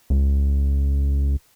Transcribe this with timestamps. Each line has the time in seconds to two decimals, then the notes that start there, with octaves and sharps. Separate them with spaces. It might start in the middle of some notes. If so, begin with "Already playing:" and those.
0.10 C#2